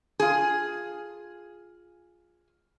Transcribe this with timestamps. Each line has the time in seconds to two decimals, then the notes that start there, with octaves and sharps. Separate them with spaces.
0.20 F4 G#4